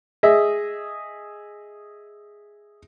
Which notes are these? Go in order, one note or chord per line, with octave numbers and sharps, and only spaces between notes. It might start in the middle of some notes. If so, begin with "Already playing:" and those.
G#4 D#5 E5